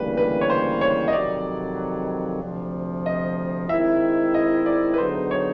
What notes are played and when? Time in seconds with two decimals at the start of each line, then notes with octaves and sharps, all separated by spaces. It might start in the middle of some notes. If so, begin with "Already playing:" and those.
Already playing: D2 C#3 E3 G3 A#3 B4
0.17 B4
0.41 C#5
0.50 C5
0.81 C#5
1.08 D#5
1.13 F2 C3 D#3 F#3 D5
2.42 D2 C3 F3
3.06 D#5
3.69 D#3 G#3 C4 E4 E5
4.34 D#5
4.66 D5
4.94 B4
4.98 D3 F#3 B3 D#4 G#4 C5
5.31 C#5